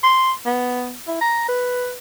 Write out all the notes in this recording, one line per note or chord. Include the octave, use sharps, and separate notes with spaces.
C6
B3
E4
A#5
B4